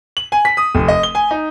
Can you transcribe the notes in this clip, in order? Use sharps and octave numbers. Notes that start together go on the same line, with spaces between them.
F#7
G#5
B6
D#6
F1
D#5
G7
G#5
D#4